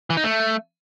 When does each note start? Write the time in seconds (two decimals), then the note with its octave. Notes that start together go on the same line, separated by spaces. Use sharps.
0.10 E3
0.17 D#4
0.24 A3